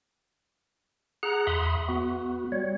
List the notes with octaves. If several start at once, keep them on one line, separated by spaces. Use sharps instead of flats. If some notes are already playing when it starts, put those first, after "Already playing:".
G#4 F#5 A#5 F#6
E2 E5 B5 C6 D#6
B3 F#4
G3 C#5